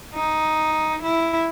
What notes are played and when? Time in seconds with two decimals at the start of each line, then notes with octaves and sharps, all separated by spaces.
0.15 D#4
1.03 E4